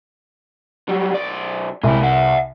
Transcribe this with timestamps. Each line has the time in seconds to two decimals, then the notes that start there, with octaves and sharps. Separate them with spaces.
0.89 F#3 G3
1.13 B1 D5
1.83 C2 G#3 E4
2.03 E5 F#5